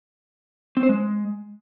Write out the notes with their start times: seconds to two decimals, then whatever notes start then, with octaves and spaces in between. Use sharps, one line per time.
0.77 C4
0.83 C5
0.89 G#3